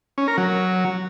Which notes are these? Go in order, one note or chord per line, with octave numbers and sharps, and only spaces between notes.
C#4
A#4
F#3